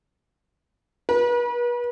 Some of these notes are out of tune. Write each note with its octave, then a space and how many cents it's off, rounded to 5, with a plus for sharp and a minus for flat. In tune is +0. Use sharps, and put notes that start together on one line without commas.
B4 -40